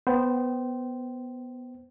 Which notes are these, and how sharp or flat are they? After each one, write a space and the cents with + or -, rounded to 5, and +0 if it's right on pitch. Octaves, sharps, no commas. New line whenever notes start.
B3 +0 C5 +0 G5 -25